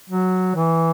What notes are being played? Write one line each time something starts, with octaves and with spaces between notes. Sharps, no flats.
F#3
E3